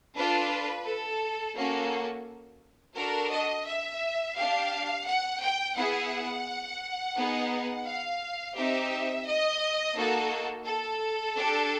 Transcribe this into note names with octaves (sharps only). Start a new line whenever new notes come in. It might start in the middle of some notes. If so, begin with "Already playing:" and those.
D4 F4 A4 B4
A4
A#3 C#4 F#4 A4
D4 F#4 A4 A#4
D#5
E5
D4 G4 F5
F#5
G5
B3 E4 G#4 F#5
B3 D#4 G#4
F5
C4 D#4 G4 E5
D#5
A#3 D#4 F#4 A4
A4
D4 G4